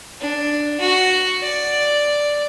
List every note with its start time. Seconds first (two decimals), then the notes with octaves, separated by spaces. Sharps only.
0.20 D4
0.80 F#4
1.43 D5